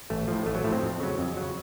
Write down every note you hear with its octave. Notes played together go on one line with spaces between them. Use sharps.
A1 A3
A2 F3
A1 A3
F#3
A2 F3 A3
C4
F2
C#3 F#3
F2
C#3 F#3